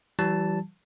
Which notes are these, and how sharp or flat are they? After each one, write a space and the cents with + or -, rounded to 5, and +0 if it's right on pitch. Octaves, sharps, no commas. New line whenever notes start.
E3 +15 G3 -35 A5 +0